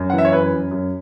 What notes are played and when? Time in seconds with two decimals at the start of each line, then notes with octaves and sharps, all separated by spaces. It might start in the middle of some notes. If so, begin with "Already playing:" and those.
Already playing: F#2
0.10 F#5
0.13 E3
0.18 E5
0.25 C#5
0.33 F#2 B4
0.53 F#2
0.71 F#2